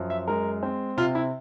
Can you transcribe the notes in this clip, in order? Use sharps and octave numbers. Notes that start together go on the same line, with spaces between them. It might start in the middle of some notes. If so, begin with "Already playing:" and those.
Already playing: F#2 F3
E5
G#3 A#4
C4
C3 F4
E4